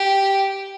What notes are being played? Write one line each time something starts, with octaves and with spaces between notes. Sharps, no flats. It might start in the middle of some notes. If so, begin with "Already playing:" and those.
Already playing: G4